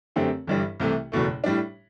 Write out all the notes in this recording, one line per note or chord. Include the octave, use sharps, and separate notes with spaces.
F#2 D3 A3 C4 G4
G1 G2 E3 G3
C2 C3 E3 A3
F#1 E2 B2 A3
A2 G3 D4